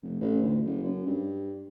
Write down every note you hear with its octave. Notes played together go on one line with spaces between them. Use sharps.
F1
A1
D2
F#1
F#2
G2